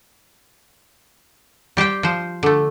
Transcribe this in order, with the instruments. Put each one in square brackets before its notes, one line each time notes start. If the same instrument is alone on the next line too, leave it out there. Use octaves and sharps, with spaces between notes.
[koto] G3 G4 C5 G5
F3 C5
D3 A3